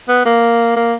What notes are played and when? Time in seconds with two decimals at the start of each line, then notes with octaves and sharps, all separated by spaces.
0.09 B3
0.25 A#3
0.76 A#3